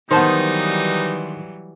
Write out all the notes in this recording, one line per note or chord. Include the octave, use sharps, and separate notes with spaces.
D#3 E3 F#3 G3 B3 D#4 C5 A5